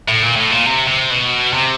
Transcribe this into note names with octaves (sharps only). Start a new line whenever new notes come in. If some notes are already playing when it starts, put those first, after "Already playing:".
A2
A#2
A2
A#2
C3
C3
B2
C3